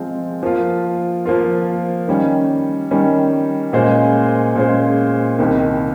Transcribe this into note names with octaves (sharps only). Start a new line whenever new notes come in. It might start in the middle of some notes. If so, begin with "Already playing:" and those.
Already playing: F3 G#3 C4
F3 A#3 F4
F3 A#3 F4
D#3 G3 C#4
D#3 G3 C#4
A#2 G#3 C#4 G#4 C5
A#2 G#3 C#4 G#4 C5
C2 C3 D#3